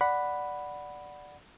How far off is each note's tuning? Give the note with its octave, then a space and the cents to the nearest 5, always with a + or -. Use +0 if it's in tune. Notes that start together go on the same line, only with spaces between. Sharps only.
D5 +0 F#5 +0 B5 +0